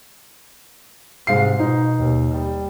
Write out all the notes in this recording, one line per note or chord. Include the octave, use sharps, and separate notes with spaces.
G#2 C3 F5 C7
B2 D#4
D#2 B2
G3